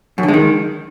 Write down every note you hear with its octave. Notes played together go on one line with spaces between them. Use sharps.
F#2
D3
G#3
D#3